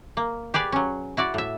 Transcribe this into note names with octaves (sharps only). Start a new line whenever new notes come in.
A#3
G4 G#4 B4 D5
F#3 C#4
E4 F#4 D5
A2 E5